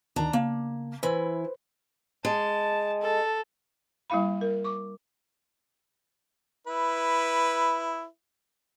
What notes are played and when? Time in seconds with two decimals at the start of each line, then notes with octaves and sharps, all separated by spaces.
0.16 D2 D#3 D4 A#5
0.33 C#3 A#3
1.03 E3 E4 B4 C5
2.25 G#3 A5
3.01 A4
4.10 G3 A#3 E4 F5 B5
4.41 A#4
4.64 C#6 D6
6.67 E4 B4